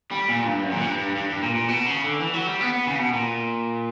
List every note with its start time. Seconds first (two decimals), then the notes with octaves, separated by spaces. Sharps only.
0.11 G3
0.28 A#2
0.45 G2
0.63 F#2
0.72 A#2
0.81 G2
0.98 G2
1.16 G2
1.30 G2
1.42 A#2
1.55 A#2
1.68 B2
1.86 C#3
2.04 D3
2.20 E3
2.34 F#3
2.47 G3
2.61 B3
2.73 B3
2.87 C#3
2.99 B2
3.13 A#2